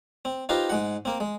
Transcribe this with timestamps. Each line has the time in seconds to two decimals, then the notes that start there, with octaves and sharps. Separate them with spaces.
0.25 C4
0.49 D#4 F4 G4 B4 C5 A#5
0.70 G#2 G#3 F#5
1.05 A#3 C4
1.20 G#3